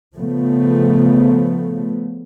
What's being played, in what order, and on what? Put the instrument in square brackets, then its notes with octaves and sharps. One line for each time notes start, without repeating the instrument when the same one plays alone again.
[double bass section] C#3 F3 A3 B3